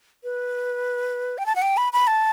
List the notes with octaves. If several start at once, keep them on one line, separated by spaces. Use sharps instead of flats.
B4
G5
A5
F#5
G5
B5
B5
A5